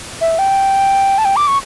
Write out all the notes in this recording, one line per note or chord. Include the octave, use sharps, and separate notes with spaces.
E5
G5
A5
G5
D6
C#6